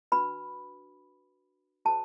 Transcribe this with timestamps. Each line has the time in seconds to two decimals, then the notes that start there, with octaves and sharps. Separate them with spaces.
0.12 D4 F#4 B4 B5
1.85 F#4 A4 C5 A5